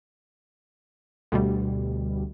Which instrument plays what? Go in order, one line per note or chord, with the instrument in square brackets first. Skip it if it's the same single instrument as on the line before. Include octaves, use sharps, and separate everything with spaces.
[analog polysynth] D2 B2 G3